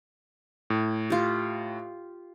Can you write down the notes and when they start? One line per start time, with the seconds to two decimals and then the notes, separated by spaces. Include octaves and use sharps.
0.70 A2
1.10 F4 G4